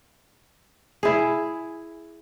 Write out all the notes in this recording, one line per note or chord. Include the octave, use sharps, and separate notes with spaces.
E4 G#4